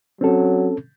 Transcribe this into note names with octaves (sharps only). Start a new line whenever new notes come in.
F#3 C4 C#4 A4